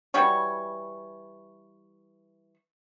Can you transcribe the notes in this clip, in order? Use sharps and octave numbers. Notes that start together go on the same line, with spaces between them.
E3 G3 F#4 C#5